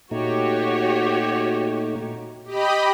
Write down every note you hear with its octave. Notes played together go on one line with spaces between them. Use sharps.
A#2 A3 D#4 F#4 G4 C#5
G4 D#5 B5